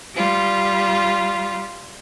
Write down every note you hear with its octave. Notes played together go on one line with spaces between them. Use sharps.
G3 F4